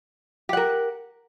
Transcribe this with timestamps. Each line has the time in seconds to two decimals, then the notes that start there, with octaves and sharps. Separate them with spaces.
0.49 G4
0.53 F#5
0.57 A#4